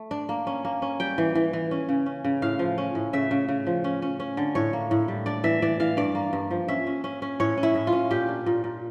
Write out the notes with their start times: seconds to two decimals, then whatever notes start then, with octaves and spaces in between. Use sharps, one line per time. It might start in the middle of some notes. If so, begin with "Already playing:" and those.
Already playing: A3
0.11 D4
0.29 A#3
0.47 C#4
0.65 A#3
0.82 C#4
1.00 G3 G5
1.18 E3
1.35 E3
1.53 E3
1.71 C#4
1.89 C#3
2.06 C#4
2.24 C#3
2.42 A2 F5
2.59 F3
2.78 C#4
2.95 A2
3.13 C#3 E5
3.31 C#3
3.49 C#3
3.67 F3
3.84 C#4
4.02 C#4
4.20 C#4
4.37 D3
4.55 A2 C#5
4.73 A#3
4.91 A2
5.08 G3
5.26 D4 D5
5.44 E3 E5
5.62 E3 D5
5.80 E3 F5
5.97 G2 D5
6.15 A#3
6.33 G2
6.51 F3
6.68 C#4 E5
6.87 C#4
7.04 C#4
7.22 C#4
7.40 A2 C#5
7.58 C#4
7.63 E4
7.75 A2
7.87 F4
7.92 C#4
8.11 A#2 G4
8.28 D4
8.46 A#2
8.64 A#2